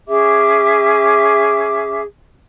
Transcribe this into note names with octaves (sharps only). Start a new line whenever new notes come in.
C#4 G#4 E5 D6